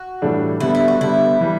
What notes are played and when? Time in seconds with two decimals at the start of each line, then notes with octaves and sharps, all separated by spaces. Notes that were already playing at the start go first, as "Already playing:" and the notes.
Already playing: F#4
0.22 A2 E3 G3 D4 A4
0.60 D3 G3 B3 E4
0.75 E4
0.88 F#4
1.01 D3 G3 B3 E4
1.40 E3 G3